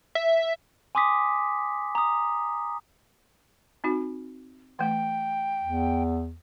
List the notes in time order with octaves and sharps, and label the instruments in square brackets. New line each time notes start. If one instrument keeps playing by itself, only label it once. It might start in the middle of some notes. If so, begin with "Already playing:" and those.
[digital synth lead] E5
[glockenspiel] G#5 C6 D6 D#6 B6
A#5 D#6
[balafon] C4 D#4 F#4
[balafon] E3 A3 [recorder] G5
[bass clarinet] E2